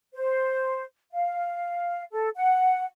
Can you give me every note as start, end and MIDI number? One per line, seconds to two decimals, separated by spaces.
0.14 0.83 72
1.12 2.03 77
2.11 2.29 69
2.36 2.85 78